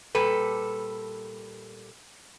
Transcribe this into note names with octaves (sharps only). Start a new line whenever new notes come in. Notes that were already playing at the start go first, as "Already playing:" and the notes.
A#2 G3 A4 B4